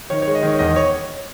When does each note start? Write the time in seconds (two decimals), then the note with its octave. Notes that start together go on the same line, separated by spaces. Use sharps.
0.10 D#3 C#5
0.22 G#3 C#5
0.35 D#5
0.43 D#3 C#5
0.59 E2 D#5
0.76 C#5